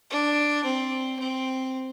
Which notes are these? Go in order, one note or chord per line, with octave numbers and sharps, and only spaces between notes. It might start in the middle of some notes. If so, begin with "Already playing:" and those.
D4
C4
C4